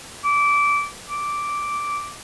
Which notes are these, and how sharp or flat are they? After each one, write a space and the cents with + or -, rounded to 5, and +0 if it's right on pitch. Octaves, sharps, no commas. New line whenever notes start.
D6 -20
D6 -5